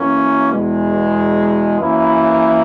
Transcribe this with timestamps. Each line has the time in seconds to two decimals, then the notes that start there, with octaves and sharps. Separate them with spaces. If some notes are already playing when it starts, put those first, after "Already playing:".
Already playing: F#2 E3 A#3 C#4
0.53 E2 B2 G#3
1.80 F#2 E3 A#3 E4